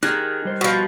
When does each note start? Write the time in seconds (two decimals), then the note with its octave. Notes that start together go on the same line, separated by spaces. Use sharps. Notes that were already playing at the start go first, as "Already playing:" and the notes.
0.03 D#3 D#4 G4 G#4 F#6 G#6
0.45 G3 C5
0.61 B2 F3 F#4